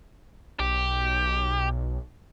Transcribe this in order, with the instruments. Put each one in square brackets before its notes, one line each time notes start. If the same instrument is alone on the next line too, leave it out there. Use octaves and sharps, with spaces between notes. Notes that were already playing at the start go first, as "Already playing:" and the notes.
[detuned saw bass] B1 [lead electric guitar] G4